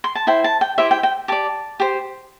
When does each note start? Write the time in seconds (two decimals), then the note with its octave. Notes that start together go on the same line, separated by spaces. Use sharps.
0.04 C6
0.15 A5
0.27 E4 C5 G5
0.44 A5
0.61 G5
0.78 E4 G4 C5 E5
0.91 G5
1.03 G5
1.28 G4 D5 A5
1.80 G4 C5